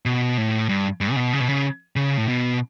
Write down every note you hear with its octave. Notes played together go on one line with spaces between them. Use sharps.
B2
A2
G2
G2
C#3
B2
C#3
B2
C#3
C#3
A2
B2